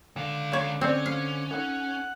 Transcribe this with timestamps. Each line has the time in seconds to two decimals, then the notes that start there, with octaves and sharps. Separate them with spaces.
0.16 C#2 D3 F5 A#5
0.52 C#3 C#5
0.81 C4 C#4 C5 D5
1.06 F5
1.51 D#4 A4 F#5